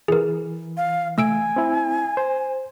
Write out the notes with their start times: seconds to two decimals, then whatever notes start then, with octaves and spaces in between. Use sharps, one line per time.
0.08 E3 G#4 A#4
0.77 F5
1.18 A3 G#5 E6 D7
1.56 C4 E4
2.17 C5